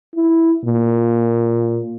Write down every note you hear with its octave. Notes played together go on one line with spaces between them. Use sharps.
E4
A#2